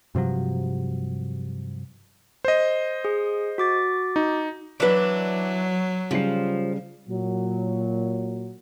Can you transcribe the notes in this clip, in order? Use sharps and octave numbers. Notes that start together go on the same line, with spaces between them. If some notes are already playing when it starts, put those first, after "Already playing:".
G2 C3 F3 F#3
C5 D#5
G#4
F#4 D6 A6
D#4
E3 F#3 D4 B4 D5
C#3 F3 G3 C7
A#2 F#3